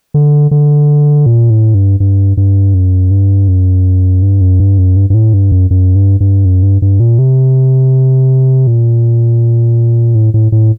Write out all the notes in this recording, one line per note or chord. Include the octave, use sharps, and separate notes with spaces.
D3
D3
A#2
A2
G2
G2
G2
F#2
G2
F#2
G2
F#2
G2
F#2
G2
G2
A2
G2
F#2
F#2
G2
G2
F#2
G2
G2
A#2
C3
A#2
A2
A2
A2